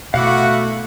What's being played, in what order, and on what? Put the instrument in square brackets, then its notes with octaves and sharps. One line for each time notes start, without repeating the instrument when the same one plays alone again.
[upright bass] B2 [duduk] A3 [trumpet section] E4 F#4 F#5 [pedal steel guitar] F5 D6